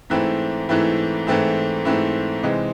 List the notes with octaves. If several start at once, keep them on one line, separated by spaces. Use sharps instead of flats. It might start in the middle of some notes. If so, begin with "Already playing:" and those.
G#2 E3 A3 C4 E4
G#2 E3 A3 C4 E4
G#2 E3 A3 C4 E4
G#2 E3 A3 C4 E4
C3 E3 G#3 C4 D#4